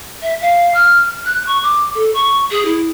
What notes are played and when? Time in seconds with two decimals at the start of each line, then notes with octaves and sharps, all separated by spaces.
0.22 E5
0.41 F5
0.75 F6
1.25 F#6
1.47 C#6
1.63 D6
1.95 A4
2.14 C#6
2.51 G#4
2.65 E4